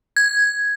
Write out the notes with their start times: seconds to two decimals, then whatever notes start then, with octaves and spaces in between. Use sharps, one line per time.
0.16 G#6